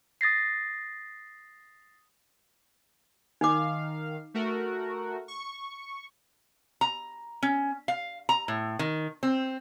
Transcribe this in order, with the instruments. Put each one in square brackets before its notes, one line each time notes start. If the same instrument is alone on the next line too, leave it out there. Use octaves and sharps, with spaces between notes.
[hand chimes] D#6 A6 A#6 C7
[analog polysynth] D#3 F5 [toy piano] D#4 D6
[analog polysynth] A3 F#4 A#4
C#6
[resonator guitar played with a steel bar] A#5
C#4
F5
A#5
A2
D#3
C4